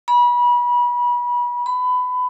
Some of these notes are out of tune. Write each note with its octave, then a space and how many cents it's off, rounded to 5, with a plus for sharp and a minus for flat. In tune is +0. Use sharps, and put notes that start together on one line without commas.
B5 -30
B5 +20